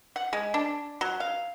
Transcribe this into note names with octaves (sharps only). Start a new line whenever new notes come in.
F#5
G#3
D4
F#3
F5